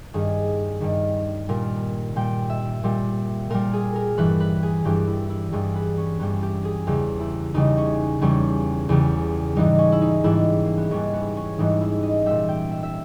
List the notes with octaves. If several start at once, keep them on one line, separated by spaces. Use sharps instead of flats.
G2 D#3 G3 G#4
G2 D#3 G3
A#2 G3 A#4
A#2 G3 G5
E5
A#2 G3
A#2 G3 A#4
G#4
A#4
G2 E3 G3 B4
B4
G#4
G2 E3 G3 G4
E4
E4
G2 E3 G3 G#4
B4
C#4
G2 E3 G3 B3
G4
G#4
E2 C#3 G3 G4
E4
E2 C#3 G3 D#4
C#4
E2 C#3 G3 C#4
E2 C#3 G3
G#2 E3 G3 D#4
C#4
E4
D#4
G#2 E3 G3 E4
A#3
B3
G#2 E3 G3 C#4
B3
C#4
G#2 E3 G3 D#4
E4
D#5
A#2 G3 E5
G5
E5
E5